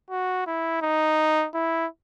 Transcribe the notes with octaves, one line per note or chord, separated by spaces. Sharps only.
F#4
E4
D#4
E4